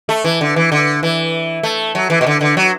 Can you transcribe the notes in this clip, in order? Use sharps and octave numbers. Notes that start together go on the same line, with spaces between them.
A3
E3
D3
E3
D3
E3
A3
F#3
E3
B2
D3
D3
F#3